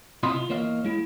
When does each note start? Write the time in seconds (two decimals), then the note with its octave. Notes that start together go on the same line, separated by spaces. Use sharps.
0.23 C3 E4 F4 D#5 C6
0.36 F4
0.49 E2 A#3 C#5 D#5 F5
0.85 G#3 E4